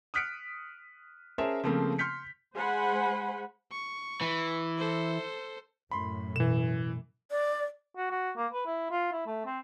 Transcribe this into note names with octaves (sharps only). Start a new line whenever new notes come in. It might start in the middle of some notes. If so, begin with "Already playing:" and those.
D#6 F6 F#6 B6 C#7 D7
C#4 G#4 A#4 C5 E5 A5
C#3 F3 A3 A#3 C4
C6 F6 G6 B6 C#7
G#3 C5 F#5 G#5 B5 C6
C#6
E3
A4 C5
F#2 A2 B5 C6
B2 E3 E7
D5
F#4
F#4
A#3
B4
E4
F4
E4
A3
C4